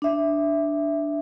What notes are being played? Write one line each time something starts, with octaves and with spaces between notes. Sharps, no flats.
D4 E5